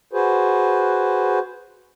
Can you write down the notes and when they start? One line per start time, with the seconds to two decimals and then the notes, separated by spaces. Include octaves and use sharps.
0.13 F#4 G#4 B4 C5